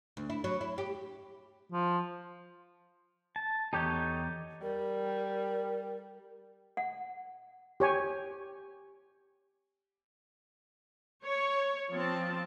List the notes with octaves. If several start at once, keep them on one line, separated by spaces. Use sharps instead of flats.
D2
E4
F#3
E4
G4
F3
A5
E2 D#4 G4 A4 C#5
G3 A#4
F#5
G4 C#5 G#5
C#5
F3 C4 A5